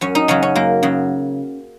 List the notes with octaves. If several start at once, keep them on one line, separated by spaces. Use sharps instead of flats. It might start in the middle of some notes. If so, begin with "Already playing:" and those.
F#2 C#4
D#4
C#3 F#3 C#4
C#4
F#2 A#3
C#3 F#3